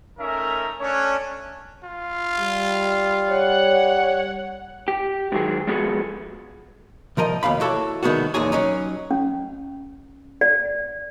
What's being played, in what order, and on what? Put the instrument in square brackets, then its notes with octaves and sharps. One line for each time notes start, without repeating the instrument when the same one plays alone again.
[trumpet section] A3 C#4 D#4 A#4 E5
A3 C#4 D4 C#5
[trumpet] F4
[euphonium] G3
[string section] C#5 F#5
[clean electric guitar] G4
G#2 D#3 F#3 G#4
F3 G#3 B3 F#4 G#4 A4
[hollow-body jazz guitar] C2 F3 A#4 D#5
D#2 B2 F5 B5
E4 F#4 A4 C#5 D5
C2 D#3 G#3 B3 F#4
B1 E2 A#2 D#4 G#4 C#5
F#3 C#4 D#4
[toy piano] C#4
D5